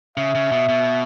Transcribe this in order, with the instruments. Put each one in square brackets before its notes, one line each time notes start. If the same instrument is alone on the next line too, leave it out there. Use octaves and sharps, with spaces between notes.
[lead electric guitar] C#3 [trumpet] E5
[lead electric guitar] C#3
B2
B2